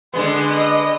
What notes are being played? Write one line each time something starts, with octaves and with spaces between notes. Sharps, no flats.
D3 G#3 B3 C6
D#5